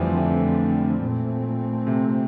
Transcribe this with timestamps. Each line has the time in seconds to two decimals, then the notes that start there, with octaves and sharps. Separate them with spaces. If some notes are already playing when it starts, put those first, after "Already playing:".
Already playing: F2 D3 E3 F3 G3 A3 C4
0.16 E3
1.01 A#2 A3 C4
1.87 C3